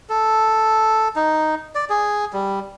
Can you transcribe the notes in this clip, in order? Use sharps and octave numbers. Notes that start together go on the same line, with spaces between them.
A4
D#4
D5
G#4
G3